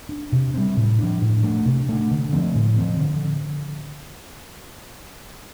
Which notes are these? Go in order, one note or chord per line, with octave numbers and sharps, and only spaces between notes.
D4
C3
G3 C4
A2
F3 D4
A2
A3 D4
C3
A3 D4
D3
F3 A3 C4
A2
F3 C4
D3